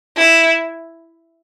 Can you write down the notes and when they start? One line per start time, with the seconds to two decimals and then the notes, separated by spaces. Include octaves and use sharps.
0.16 E4